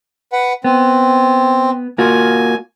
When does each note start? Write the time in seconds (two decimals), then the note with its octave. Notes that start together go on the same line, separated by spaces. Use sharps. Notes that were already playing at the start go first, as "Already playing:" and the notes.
0.33 B4 F#5
0.64 B3 C4
1.98 A#3 F4 F#4 G#5